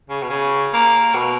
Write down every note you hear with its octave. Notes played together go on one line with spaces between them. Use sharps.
C#3
B2
C#3
A#3
B2